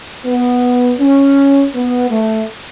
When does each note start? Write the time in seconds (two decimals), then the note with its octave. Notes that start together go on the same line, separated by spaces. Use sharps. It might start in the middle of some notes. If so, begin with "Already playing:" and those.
0.25 B3
0.99 C#4
1.73 B3
2.10 A3